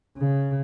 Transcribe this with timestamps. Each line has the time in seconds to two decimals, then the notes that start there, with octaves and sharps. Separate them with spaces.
0.17 C#3